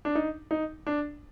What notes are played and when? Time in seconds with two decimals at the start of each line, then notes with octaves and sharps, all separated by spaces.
0.05 D4
0.15 D#4
0.51 D#4
0.87 D4